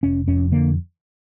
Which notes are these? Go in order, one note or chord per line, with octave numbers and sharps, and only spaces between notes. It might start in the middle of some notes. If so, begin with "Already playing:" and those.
F1 C#4
F2 C#4
D3 A#3